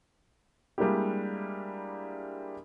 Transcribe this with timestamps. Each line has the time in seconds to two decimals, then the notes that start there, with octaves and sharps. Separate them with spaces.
0.78 G3 G#3 A#3 D4 E4 G4